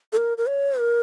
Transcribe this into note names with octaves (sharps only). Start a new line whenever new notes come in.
A4
A#4
A#4
C#5
A#4